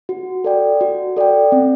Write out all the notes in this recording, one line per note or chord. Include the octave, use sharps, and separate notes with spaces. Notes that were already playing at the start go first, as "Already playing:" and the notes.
F#4
A4 D5 G5
F#4
A4 D5 G5
C4